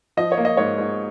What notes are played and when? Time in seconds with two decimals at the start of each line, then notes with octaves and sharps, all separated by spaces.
0.17 F3 D#5
0.32 C#5
0.38 A#3
0.45 D#5
0.57 G#2 C#5
0.78 G#2